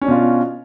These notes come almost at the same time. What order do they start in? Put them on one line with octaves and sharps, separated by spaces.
C#4 D4 B2 F4